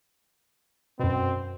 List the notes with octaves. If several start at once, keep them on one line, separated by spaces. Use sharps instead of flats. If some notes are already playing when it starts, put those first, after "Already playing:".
F#2 B2 C4